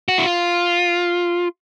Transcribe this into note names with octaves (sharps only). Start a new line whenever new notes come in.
F#4
E4
F4